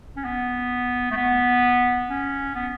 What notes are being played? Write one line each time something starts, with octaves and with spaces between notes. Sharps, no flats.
C#4
B3
A3
B3
C#4
B3